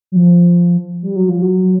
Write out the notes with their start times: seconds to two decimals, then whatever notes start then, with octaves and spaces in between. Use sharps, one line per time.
0.12 F#3
0.16 F3
1.03 G3
1.16 F#3
1.29 F3
1.42 F#3